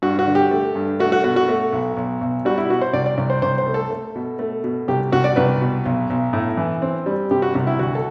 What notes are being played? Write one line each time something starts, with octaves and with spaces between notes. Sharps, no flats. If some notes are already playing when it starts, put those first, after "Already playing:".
G2 F#4
F#4
D3
G4
A3
G2
A3 F#4
F#4
B2 F#4
F#4
A3
B1
B1
B1
G3 F#4
E4
B2 F#4
C5
C2 D5
D5
C2
C5
C2 C5
C5
A3
A4
A3
B2
A3
B2
C2 G4
C2 F#4
D5
C2 B4
B2
B1
B1
A2
E3
C4
G3
C3 G4
F#4
C2
E4
D2 F#4
A4